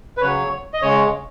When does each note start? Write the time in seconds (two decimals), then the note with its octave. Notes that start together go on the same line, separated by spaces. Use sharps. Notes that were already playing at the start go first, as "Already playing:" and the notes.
0.17 B4
0.21 C#3 F#3 C#5
0.73 D#5
0.82 C#3 G#3 C#5